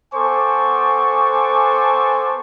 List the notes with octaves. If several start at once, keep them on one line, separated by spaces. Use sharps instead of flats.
B3 A4 C5 G#5 C#6 D6